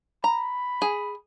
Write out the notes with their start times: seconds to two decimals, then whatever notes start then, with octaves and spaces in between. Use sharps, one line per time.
0.24 A#5 B5
0.82 G#4